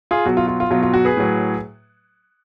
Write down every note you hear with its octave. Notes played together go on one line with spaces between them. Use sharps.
F4 G#4
B2 F#3 F#4
F4
F4
F4
B2 F#3 F4
F4
F#4
G#4 B4
A2 F#3